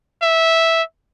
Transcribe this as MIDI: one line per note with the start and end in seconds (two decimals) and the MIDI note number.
0.22 0.83 76